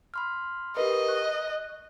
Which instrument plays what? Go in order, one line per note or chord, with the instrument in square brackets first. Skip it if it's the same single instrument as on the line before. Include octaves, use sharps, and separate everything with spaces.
[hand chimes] B5 C6 F6
[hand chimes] G4 A#4 B4 [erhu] D#5
[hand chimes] C#6 F#6